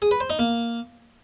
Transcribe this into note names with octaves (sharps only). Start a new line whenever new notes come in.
G#4
B4
C5
D#4
A#3